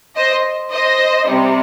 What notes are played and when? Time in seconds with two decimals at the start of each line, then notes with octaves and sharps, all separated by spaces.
0.17 C5 D#5
0.72 C5 D#5
1.28 C3 G3